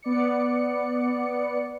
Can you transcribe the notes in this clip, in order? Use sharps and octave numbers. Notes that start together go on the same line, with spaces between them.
B3 D5 C#7